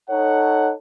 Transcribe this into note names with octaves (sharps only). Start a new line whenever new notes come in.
D#4 A4 C#5 F#5